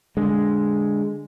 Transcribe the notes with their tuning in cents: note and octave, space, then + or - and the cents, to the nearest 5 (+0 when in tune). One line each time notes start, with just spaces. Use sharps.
D3 +0 G#3 +0